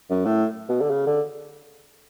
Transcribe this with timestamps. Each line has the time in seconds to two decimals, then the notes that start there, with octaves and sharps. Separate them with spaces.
0.10 F#2
0.26 A2
0.69 B2
0.81 D3
0.91 C#3
1.07 D3